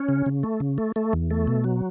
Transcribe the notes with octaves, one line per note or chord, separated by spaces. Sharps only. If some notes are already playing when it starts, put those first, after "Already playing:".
Already playing: C#4
C#3
C#3
A3
C#3
A3
A3
E2
A3
B2
F#3